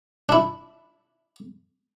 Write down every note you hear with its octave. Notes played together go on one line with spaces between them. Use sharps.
D4 E4